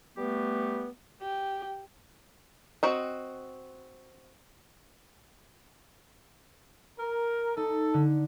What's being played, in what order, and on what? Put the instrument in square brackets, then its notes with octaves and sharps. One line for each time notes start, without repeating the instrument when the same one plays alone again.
[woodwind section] G3 A3 B3 G4 B4
[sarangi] G4
[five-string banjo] C4 F#4 D#5
[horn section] A#4
[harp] D#4 [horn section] A4
[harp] D3